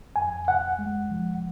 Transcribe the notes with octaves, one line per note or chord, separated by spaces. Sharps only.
F2 G#5
F2 F#5
G#3
F3